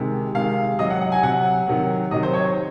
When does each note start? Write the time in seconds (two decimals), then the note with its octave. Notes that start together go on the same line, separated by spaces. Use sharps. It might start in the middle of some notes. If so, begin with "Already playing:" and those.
Already playing: C3 D#3 G#3
0.34 C3 D#3 G#3 F5
0.79 C3 F#3 D#5
0.90 F#5
1.01 F#5
1.12 G#5
1.23 C3 F#3 F#5
1.68 C3 D#3 F#3
2.11 C3 D#3 F#3 D#5
2.23 C5
2.33 C#5
2.44 C5